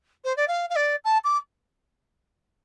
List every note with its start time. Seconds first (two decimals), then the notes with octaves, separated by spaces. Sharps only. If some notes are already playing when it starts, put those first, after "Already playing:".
0.24 C5
0.37 D5
0.48 F5
0.70 F5
0.76 D5
1.05 A5
1.24 D6